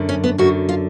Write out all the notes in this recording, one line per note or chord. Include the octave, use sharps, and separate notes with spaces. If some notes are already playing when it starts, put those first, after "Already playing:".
Already playing: F#2 D3
C#4
B3
F#2 D3 F#4
F4